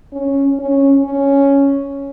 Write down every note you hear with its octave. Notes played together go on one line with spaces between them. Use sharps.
C#4
C#4
C#4